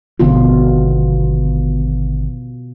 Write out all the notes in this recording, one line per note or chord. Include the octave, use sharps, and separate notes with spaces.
G#1 B2 D3 F3 F4